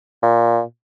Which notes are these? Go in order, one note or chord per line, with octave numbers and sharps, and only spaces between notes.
A#2